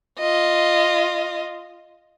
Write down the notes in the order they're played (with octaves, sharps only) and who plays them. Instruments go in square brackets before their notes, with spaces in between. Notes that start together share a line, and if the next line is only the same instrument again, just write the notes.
[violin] F4 D#5